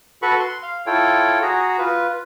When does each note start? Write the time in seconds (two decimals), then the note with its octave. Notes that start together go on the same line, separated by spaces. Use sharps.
0.22 F#4 A4 B4 B5 C#6
0.39 C6
0.63 F5
0.86 E4 F4 A4 C#5 G5
1.42 F#4 G#4 A#5
1.78 F4 B4